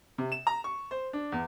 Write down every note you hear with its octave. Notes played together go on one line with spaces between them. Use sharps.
C3
E7
A#5
C#6
C5
D4
E2